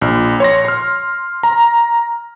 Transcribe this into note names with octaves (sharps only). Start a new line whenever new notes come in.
A#1
C#5 C6 A#6
C6 F6
A#5